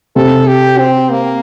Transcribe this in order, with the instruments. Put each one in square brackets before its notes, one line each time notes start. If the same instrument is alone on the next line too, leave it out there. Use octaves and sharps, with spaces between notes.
[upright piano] C3 [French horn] A4
[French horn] G4
C4
A#3